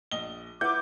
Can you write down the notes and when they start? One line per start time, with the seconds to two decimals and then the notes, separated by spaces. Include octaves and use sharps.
0.11 A#1 D#5 G7
0.61 E4 B4 F#5 D6 G6